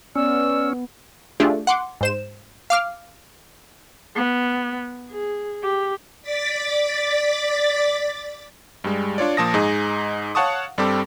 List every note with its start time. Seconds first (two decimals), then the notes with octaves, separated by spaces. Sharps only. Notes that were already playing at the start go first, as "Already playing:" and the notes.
0.16 B3 C#4 D5 E6
1.40 A3 D4 F4 G4 G#4
1.67 F#5 C6 D6
2.01 G#2 C5 E7
2.70 F5 D6 F6
4.16 B3
5.11 G#4
5.63 G4
6.22 D5 D6 A6 B6
8.84 G2 G3 G#3
9.18 D4 F4 C#5 D5
9.37 A#2 F3 A5 D#6 A#6
9.54 G#2 D#4 G#4
10.35 C#5 F5 F#5 A5 C#6 D#6
10.78 G2 G3 C4 G4 A4 D6